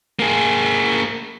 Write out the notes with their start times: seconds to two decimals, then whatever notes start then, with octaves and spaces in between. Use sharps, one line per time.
0.19 A#3 G#4